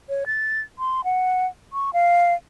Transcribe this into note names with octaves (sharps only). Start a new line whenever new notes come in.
C#5
A6
C6
F#5
C#6
F5